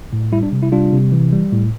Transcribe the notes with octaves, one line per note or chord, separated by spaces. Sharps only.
A2
G3 E4
D4
C3
E4
G3 D4 F4
C3
E3
G3
A2